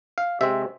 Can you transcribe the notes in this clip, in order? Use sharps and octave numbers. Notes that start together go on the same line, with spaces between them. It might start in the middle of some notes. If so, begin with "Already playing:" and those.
F5
C3 G#3 C4 E5